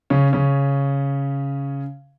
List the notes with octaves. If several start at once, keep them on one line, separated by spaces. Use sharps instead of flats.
C#3 C#4
C#3 C#4